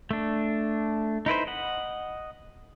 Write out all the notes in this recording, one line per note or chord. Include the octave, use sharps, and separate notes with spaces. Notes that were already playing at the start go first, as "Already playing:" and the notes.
A3 D4
D#4 E4 B4 C5
D#5 F#5